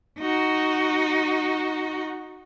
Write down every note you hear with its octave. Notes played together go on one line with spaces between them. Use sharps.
D#4 F#4